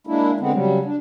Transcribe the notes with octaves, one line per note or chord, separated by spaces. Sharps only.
G#3 A#3 D4 E4
D3 G#3 B3 C4
C#3 F#3 G3
D4